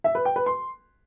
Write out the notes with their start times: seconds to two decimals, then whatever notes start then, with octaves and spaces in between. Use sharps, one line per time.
0.04 E5
0.15 B4
0.25 G5
0.36 B4
0.46 C6